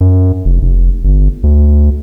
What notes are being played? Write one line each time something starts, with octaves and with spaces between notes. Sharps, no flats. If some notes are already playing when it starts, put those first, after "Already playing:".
F#2
F1
F1
G1
D2